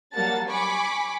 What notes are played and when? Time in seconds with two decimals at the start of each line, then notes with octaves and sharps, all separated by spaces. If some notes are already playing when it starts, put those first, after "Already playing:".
0.13 F#3 G3 A#3 F#5 A5 A6
0.47 G#5 B5 C#6 D6